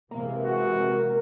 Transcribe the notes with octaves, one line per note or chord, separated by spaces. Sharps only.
C3 E3 G#3 A#3
F#4